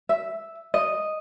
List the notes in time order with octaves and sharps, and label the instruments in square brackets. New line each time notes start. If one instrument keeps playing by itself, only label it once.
[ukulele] E5
D#5